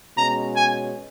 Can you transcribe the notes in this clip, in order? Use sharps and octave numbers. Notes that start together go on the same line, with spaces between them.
B2 G#3 C#4 A#5
G#5